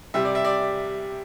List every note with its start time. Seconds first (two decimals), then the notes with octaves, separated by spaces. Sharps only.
0.14 C3 G3 E5
0.25 D5
0.35 E5
0.45 D5